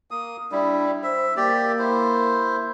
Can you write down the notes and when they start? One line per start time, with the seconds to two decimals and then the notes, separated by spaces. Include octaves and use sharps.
0.11 A#3 D#6
0.52 G3 D4 E4
1.03 C5 E5
1.37 A#3 G4 D5
1.79 E4 C5